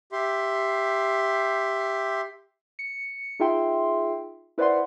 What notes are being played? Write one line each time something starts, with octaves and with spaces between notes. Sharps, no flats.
G4 E5 C6
C#7
D#4 F4 G#4 E5 G5 C6
E4 B4 C5 D5 F#5 C6